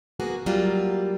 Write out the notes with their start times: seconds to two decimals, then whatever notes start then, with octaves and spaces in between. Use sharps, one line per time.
0.20 A#3 B3 F#4 G#4
0.46 F#3 G3 A#3 F4